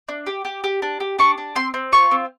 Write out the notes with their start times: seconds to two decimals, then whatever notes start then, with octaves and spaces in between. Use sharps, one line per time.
0.09 D4
0.26 G4
0.45 G4
0.64 G4
0.82 D4
1.00 G4
1.19 D4 C#6
1.38 D4
1.55 C4 C6
1.74 C4
1.92 F4 C#6
2.11 C4